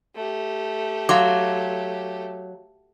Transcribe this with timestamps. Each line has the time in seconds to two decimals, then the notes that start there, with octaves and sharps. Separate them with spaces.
0.15 A3 G4
1.09 F#3 F5 C6 D6